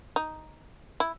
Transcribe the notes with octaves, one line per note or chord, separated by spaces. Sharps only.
D#4
E4